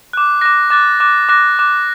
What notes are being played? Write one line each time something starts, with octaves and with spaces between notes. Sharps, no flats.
D6 F#6
D6 F#6 A#6
D6 F#6 A6
D6 F#6
D6 F#6 A#6
D6 F#6